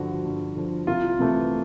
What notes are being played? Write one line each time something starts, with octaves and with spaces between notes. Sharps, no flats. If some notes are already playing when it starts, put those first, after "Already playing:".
Already playing: G2 D3 F3 F#4
G2
D3 F3
C2 F4
C3 E3 A3